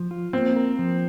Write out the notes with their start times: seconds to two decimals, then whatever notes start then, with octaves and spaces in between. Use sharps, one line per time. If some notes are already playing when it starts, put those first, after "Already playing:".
Already playing: F3
0.11 F4
0.33 A#3 C4
0.56 A#4
0.79 F3